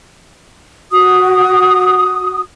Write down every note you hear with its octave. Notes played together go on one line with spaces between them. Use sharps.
F#4 D#6